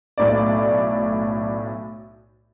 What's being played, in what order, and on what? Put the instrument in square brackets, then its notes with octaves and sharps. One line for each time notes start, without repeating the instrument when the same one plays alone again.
[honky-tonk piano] B1 A2 D5